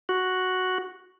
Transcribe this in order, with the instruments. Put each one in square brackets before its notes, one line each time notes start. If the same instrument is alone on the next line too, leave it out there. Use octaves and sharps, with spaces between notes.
[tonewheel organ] F#4